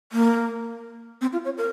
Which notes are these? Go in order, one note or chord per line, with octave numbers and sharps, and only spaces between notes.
A#3
C4
F4
C#5
A#4